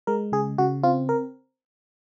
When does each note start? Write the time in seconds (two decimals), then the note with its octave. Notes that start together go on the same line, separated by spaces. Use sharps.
0.07 G#3 A#4
0.32 C#3 G#4
0.58 C#3 F#4
0.83 C4 F4
1.09 A#4